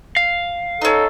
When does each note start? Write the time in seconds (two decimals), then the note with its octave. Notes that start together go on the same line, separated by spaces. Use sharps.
0.16 F5
0.82 C#4 D#4 A4